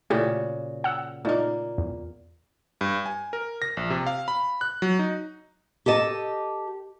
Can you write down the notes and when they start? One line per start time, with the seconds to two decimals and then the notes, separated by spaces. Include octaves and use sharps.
0.10 A#2 C#3 A3 E4 F#4 G4
0.84 F#5 E6
1.25 A#2 A3 A#3 D#4
1.78 E2
2.81 G2
3.06 G#5
3.33 A#4
3.62 A#6
3.77 A#1
3.90 C3
4.07 F5
4.28 B5
4.61 F#6
4.82 F#3
4.99 D#4
5.86 G4 A4 D#5 A5